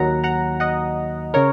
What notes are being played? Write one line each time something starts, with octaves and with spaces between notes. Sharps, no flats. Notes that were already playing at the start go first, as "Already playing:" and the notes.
Already playing: D#2 D#3 F#3 F#5 A#5
F#5 A#5
D#5 F#5
C#3 A#4 C#5